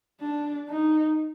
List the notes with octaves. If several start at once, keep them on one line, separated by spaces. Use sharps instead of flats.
D4
D#4